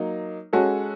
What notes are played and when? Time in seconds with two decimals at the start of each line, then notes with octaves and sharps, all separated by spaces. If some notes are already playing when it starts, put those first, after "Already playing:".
Already playing: F#3 A#3 D#4
0.53 G#3 C#4 F#4 A4